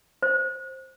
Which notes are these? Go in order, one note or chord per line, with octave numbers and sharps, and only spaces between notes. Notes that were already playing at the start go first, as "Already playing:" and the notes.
C5